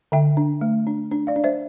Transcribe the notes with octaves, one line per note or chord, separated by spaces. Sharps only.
D3 E5 G5
D4
A3
D4
D4
D5 F5
D4
C5 E5